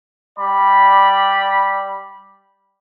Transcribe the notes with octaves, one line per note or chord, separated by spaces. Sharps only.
G3 D5 B5